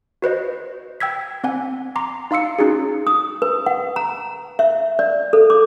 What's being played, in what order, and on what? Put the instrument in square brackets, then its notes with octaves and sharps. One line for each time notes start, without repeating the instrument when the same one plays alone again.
[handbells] F#4 B4 C5 D#5
G5 E6 G#6 B6
C4 F#5 G#5
A#5 C6 D6
D#4 F5 C6 E6 C#7
C#4 D#4 F#4 G#4
[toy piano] D#6
B4
F#5
A#5
E5
D5
A4
D6